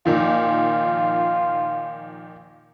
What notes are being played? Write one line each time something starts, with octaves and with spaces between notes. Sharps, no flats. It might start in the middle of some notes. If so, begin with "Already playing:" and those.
A#2 D#3 F3 F4